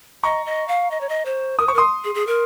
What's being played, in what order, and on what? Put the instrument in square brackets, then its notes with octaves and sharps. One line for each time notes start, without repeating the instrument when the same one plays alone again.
[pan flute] D#5 [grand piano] A#5 C#6
[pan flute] D#5
F5
D#5
C#5
D#5
C5
[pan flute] A#4 [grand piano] D#6
[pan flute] C5 [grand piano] C#6
[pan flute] A#4
[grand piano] C6 D#6
[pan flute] G#4
G#4
A#4